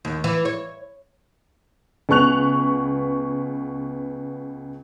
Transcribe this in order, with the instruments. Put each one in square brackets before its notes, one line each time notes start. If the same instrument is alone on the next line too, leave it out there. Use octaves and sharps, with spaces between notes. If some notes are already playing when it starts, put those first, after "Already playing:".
[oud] D#2
E3
C#5
[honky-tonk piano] C#2 B3 C#6 F#6 F7